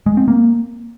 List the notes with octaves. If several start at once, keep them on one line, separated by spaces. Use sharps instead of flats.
G#3
C4
A#3